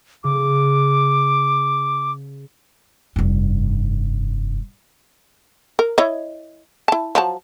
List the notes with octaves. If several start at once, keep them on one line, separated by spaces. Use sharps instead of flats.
C#3 D6
F1 G2
A#4
E4 C#5 D#5
E4 A5
F3 F#3 A5